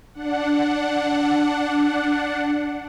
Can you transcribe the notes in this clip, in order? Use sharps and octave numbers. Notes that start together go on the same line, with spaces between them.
D4 F#5